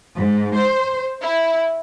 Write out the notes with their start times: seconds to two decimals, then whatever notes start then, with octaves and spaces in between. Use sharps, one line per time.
0.16 G#2
0.55 C5
1.23 E4